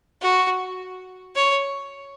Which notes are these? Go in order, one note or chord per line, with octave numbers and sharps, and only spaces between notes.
F#4
C#5